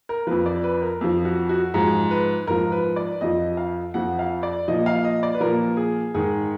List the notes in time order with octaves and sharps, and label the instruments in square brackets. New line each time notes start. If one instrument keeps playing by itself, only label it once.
[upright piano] A#4
F2 F3 B4
D5
B4
A#4
F2 F3
F#4
F#4
G#2 F3 G#4
B4
G#2 F3 A#4
B4
D5
F2 F3 D#5
F5
F2 F3 F#5
F5
D5
A#2 F3 D#5
F5
D#5
D5
B4
A#2 F3 A#4
G#4
G#2 D#3 G#4